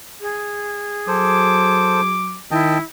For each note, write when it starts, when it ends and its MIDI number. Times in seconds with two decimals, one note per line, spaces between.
0.21 2.10 68
1.08 2.39 54
1.08 2.01 69
1.08 2.01 72
1.08 2.40 86
2.51 2.77 51
2.51 2.79 64
2.51 2.78 75
2.51 2.78 79
2.51 2.78 81